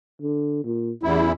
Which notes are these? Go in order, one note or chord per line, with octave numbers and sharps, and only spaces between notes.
D3
A#2
A1 E2 E4